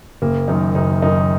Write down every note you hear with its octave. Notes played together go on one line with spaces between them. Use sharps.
F#1 A#3
F#2 D#3 D#4
F#1 D#4
F#2 D#3 D#4